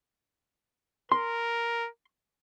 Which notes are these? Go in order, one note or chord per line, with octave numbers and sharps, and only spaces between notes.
A#4 C6